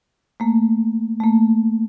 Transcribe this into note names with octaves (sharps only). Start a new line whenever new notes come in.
A3 A#3
A3 A#3